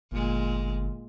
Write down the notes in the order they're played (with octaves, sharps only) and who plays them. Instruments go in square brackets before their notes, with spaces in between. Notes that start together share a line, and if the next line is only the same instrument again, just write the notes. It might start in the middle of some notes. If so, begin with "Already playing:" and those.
[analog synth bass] G1 [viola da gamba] A#2 G#3